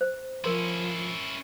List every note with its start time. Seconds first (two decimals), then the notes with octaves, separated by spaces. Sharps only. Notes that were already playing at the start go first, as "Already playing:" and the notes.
0.01 C5
0.44 F3 C#4 E4 A#4 C6